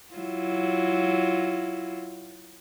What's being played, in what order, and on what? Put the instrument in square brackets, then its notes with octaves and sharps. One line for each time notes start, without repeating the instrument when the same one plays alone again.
[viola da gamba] F#3 E4 F4